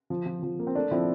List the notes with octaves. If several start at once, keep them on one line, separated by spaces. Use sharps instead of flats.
F3
F3
F3
A#3
C4
A3 D4
F3 C4 E4